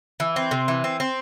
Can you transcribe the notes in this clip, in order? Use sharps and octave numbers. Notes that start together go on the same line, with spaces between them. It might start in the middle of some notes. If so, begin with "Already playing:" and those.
E3
C4
C3
E3
C4
C4